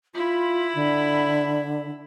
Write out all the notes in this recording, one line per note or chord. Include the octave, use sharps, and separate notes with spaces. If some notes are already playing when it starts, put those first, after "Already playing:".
E4 F4 B5
D3